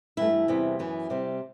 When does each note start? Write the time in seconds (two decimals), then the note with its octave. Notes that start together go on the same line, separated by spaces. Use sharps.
0.17 G2 E3 A3 E4
0.48 E2 C3 G3 B3
0.79 F#2 E3 B3
1.10 C3 G3 C4